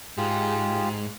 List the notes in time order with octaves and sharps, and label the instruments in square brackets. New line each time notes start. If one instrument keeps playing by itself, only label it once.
[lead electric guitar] G#2 [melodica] F4 G4 G#4